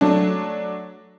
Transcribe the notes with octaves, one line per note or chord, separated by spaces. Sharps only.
F#3 A3 D4